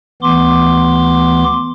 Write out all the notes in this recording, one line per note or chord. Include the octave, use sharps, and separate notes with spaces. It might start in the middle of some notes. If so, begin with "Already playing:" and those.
D2 E3 B3 C6 D6